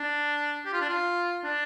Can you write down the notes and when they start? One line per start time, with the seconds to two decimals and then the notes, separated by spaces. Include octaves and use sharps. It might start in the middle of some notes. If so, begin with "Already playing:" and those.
Already playing: D4
0.66 G4
0.73 F4
0.81 D4
0.89 F4
1.44 D4